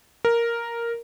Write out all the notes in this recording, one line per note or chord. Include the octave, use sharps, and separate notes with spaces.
A#4